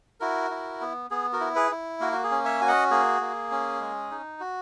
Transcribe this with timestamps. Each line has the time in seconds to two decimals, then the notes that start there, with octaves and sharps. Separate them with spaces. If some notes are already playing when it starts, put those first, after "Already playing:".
0.20 E4 F#4 A#4
0.51 E4
0.81 B3
1.11 B3 G#4
1.33 F#4 A#4
1.40 E4
1.55 G#4 B4
1.71 E4
2.00 A#3 F#4 A#4
2.12 F#4
2.23 G#4
2.31 C#4
2.45 C#5 E5
2.61 F#4 G#5
2.68 D#5 F#5
2.91 A#3 G#4
3.21 A#3
3.51 C#4
3.81 G#3
4.11 D#4
4.40 F#4